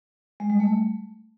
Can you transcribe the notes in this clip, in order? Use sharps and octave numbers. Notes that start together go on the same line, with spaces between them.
G#3
G3
A3